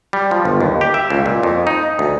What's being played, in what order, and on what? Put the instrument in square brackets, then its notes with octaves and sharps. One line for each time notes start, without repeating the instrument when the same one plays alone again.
[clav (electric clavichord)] G3
F3
G1
D#2
G4
E5
C#2
A#2
F2
D#4
D2